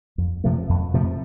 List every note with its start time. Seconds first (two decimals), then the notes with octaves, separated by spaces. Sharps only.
0.18 F2
0.44 C3 F3 A3
0.69 F2
0.94 C3 F3 A3